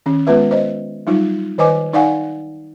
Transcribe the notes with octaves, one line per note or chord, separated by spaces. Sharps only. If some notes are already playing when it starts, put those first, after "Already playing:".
D#3 C#4
G#3 B3 F4 B4 E5
C5 D#5
F#3 G3 D#4 F4
D#3 B4 C5 D#5 G#5 D6
D#4 D5 F5 F#5 G#5